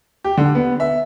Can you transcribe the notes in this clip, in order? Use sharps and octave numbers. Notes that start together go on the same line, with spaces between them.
G4
D3
B3
E5